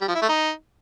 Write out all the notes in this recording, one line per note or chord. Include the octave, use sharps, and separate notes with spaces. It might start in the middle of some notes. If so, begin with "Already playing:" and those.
G3
F3
E4
A3
D#4